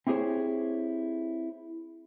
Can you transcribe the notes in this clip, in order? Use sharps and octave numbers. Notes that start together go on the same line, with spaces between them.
C4 E4 G4 G#4 C5 C#5